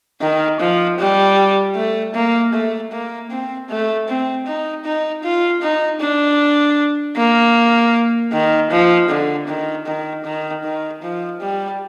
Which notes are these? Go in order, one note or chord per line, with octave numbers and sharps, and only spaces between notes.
D#3
F3
G3
A3
A#3
A3
A#3
C4
A3
C4
D#4
D#4
F4
D#4
D4
A#3
D#3
F3
D3
D#3
D#3
D#3
D#3
F3
G3